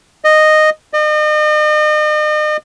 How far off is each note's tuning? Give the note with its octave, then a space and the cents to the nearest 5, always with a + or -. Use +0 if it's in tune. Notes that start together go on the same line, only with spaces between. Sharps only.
D#5 -10
D#5 -40